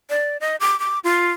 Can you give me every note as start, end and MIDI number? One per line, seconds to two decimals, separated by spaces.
0.10 0.37 74
0.40 0.56 75
0.60 0.78 86
0.80 0.99 86
1.04 1.32 65